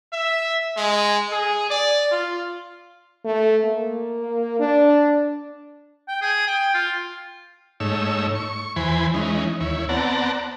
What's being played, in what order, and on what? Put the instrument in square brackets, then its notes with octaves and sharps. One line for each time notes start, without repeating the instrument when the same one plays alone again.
[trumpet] E5
G#3
G#4
D5
F4
[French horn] A3
A#3
D4
[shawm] G5
G#4
G5
F4
[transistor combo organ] G#2 A3 D#4 C#5 E6
C#6
E2 E3 C5 G#5 B5
E3 G#3 C#4 D#4
D#2 E4 C#5
B3 C4 D5 F#5 A5 A#5